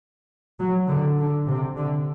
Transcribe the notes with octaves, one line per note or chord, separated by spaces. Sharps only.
F#3
D3
D3
C3
D3